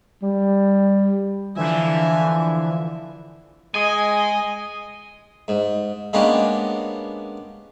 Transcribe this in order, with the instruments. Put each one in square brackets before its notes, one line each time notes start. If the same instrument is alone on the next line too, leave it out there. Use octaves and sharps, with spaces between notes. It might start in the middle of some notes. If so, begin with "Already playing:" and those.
[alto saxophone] G3
[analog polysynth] D3 E3 F3 [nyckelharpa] E5 G#5
[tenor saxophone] G#3 [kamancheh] D#5 [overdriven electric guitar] G#5
[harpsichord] G#2
G#3 A#3 B3 C#4 D4 G4